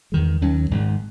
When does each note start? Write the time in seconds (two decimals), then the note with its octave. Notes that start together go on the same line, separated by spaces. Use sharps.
0.12 E2 D#3 G#3
0.42 D#2 D#3 F#3 C#4
0.71 G#1 G#2 D#3 G#3